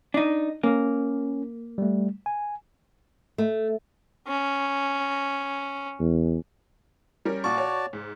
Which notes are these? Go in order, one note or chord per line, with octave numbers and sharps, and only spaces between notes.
D4 D#4
A#3 C#4
G3 A3
G#5
A3
C#4
E2
G3 C#4 A#4
A#2 F#4 D5 A5 C#6
C#5
G#2